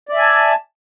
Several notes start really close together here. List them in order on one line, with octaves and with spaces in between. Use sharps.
D5 E5 G#5 A5